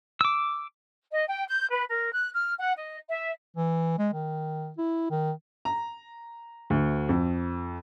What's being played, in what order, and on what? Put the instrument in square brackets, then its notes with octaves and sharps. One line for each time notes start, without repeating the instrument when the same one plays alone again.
[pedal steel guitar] D6 E6
[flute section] D#5
G5
G6
B4
A#4
F#6
F6
F#5
D#5
E5
[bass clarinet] E3
G#3
D#3
E4
D#3
[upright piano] A#5
D2
F2